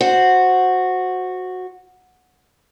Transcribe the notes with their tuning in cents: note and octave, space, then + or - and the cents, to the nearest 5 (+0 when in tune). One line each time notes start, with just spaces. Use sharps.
F#4 -10 C5 +0